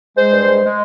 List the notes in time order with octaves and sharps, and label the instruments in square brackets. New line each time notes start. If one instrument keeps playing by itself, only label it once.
[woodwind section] G#3 C5
G2
G#3
G#3